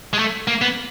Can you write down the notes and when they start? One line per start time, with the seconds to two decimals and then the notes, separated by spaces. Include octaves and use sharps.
0.13 G#3
0.19 A3
0.48 A#3
0.62 B3